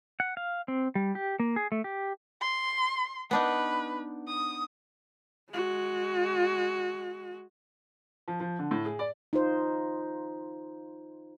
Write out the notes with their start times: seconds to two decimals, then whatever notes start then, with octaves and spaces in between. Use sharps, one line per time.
0.20 F#5
0.37 F5
0.68 C4
0.95 G3
1.15 G4
1.40 A#3
1.56 G#4
1.72 A3
1.84 G4
2.41 C6
3.31 B3 D4 D#4 B4
4.28 D#6
5.50 G#3 F#4
8.28 F3
8.40 F3
8.59 D3
8.71 A2
8.85 G#4
8.99 D5
9.33 D#4 F4 C5